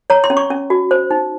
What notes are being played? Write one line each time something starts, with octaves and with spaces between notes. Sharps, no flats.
C#5 A#5
C6
C#4
C#6
C#4
F#4
C5
D#4